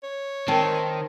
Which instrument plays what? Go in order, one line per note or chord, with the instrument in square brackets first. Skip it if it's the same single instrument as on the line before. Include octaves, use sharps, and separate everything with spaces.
[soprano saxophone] C#5
[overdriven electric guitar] D#3 [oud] C4 [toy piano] A#4 A5